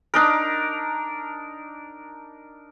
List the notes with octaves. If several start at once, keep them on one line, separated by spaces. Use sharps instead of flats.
D4 D#4 A#4